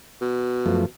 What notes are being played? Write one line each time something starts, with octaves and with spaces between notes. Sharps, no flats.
B2
F#2 F3 A3